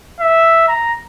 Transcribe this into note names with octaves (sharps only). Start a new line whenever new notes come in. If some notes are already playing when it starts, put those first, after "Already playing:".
E5
A#5